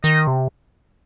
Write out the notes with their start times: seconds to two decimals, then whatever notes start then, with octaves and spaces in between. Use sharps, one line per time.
0.04 D#3 D#5
0.27 C3